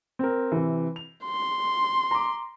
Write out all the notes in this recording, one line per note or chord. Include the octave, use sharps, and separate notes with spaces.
C4 A#4
C3 E3
F7
C6
A#5 D6